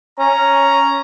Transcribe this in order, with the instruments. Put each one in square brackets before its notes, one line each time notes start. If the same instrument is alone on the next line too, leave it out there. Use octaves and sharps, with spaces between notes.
[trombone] C#4 [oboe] A#5